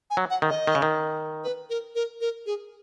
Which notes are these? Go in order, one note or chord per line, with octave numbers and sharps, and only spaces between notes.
G#5
F#3
F#5
D#3
D#5
D#3
C#3
D#3
B4
A#4
A#4
A#4
G#4